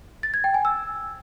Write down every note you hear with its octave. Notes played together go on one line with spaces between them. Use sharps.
A6
G#6
G5
G#5
E6